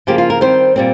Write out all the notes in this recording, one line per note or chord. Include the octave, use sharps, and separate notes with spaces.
C#3 F3 A#3 G4
F4
A#4
D#3 G3 C4 C5
A#2 G3 C4